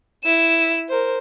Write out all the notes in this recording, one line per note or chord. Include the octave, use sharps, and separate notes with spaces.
E4 E7
A#4 C5